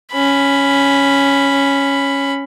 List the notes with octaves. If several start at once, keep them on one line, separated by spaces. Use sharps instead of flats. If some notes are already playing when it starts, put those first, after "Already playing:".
C#4 B5